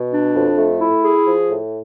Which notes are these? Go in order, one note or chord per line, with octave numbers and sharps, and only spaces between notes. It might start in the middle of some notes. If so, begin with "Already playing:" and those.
Already playing: B2
D4
F2
A3
E4
G#4
F3
A2